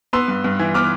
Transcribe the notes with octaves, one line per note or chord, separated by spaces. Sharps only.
B3 C6 E6
G2
G2
E3
B3 D6 F6